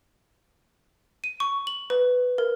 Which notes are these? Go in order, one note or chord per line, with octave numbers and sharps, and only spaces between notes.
D#7
C#6
F#7
B4
A#4